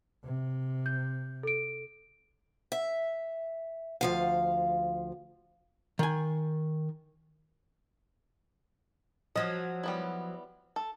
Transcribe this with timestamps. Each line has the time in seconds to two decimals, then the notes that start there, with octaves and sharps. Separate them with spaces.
0.25 C3
0.86 G6
1.43 A4 D7
2.72 E5
4.01 D2 F3 F5
5.99 D#3 G#5
9.36 F3 F#3 D#5
9.84 G3 B3 E4
10.76 A4